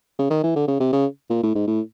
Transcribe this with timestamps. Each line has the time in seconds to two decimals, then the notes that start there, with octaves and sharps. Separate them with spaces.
0.19 C#3
0.30 D#3
0.44 E3
0.56 D3
0.68 C#3
0.80 C3
0.93 C#3
1.30 A#2
1.43 A2
1.55 G#2
1.68 A2